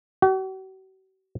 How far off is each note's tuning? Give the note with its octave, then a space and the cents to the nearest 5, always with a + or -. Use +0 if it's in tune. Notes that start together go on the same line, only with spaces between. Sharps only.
F#4 +45